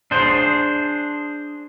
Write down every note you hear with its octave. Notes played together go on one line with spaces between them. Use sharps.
D4 G#4 C5